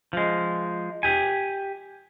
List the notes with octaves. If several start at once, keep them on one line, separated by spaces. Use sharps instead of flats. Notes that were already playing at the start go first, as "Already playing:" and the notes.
F3 G#3
G4 G#5